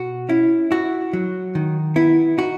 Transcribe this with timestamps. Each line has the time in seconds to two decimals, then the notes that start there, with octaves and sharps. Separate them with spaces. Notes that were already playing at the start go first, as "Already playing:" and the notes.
Already playing: B2 F#4
0.29 C#4 E4
0.71 E4 F#4
1.13 F#3
1.55 D#3
1.96 B3 E4
2.38 D#4 F#4